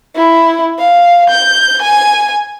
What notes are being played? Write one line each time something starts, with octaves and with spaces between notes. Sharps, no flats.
E4
F5
G6
G#5